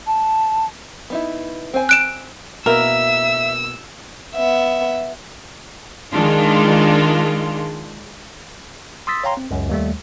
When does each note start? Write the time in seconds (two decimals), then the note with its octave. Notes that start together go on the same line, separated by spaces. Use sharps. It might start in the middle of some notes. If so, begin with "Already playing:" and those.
0.07 A5
1.10 B3 D#4 E4
1.74 C4 C5 G#5
1.89 F#6 D7 E7
2.66 B2 A#3 E4 A#4 E5 E6
4.35 B3 E5
6.13 D#3 G#3 D4 F4
9.07 C6 D#6 E6 A6 B6
9.24 C#5 F5 G5 A#5 C6
9.37 C4
9.51 C#2 F#2
9.69 D#2 G3 A3